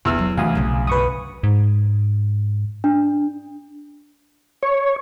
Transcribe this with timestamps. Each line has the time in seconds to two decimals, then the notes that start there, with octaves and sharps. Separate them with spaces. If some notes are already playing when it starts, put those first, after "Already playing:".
0.05 E2 D3 D4 E6 F6
0.18 F#3
0.37 D2 D3 E3 F5 G#5 D#6
0.55 B1 C#3 F3
0.87 F#2 B4 C#6 D#6
1.43 G#2
2.84 D4
4.63 C#5